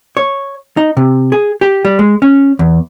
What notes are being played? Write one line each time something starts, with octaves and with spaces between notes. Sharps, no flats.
C#5
D#4
C3
G#4
G4
G3
G#3
C#4
E2